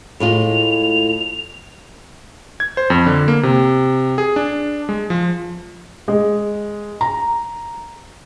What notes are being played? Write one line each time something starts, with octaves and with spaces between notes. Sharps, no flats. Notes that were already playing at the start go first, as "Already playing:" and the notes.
A2 G#3 F4 F7
G#6
C5
F2
D3
A#3
C3
G#4
D4
G#3
F3
G#3
A#5